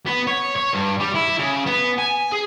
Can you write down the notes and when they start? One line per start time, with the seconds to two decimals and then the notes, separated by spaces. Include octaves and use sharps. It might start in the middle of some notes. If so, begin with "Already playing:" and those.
0.07 B3
0.27 C#5
0.56 C#5
0.73 G2
1.00 G3
1.15 E4
1.39 C#3
1.66 B3
1.98 G#5
2.32 G#4